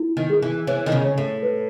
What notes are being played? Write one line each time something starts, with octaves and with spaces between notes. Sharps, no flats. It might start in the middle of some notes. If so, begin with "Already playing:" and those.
Already playing: E4
D#3
G#4
E3
E3 C#5
D#3
C#3
C#5
A2
B4